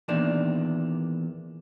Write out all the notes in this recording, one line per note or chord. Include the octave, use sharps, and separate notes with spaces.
E2 A#2 D#3 D4